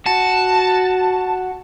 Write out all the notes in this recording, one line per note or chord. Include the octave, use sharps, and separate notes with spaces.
F#4 A5